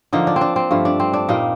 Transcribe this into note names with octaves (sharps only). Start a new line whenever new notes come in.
D3 F3 A#3 D#4
D4
C4
D4
C4
G2 F3 A3
D4
C4
D4
A#2 G3 A#3 D#4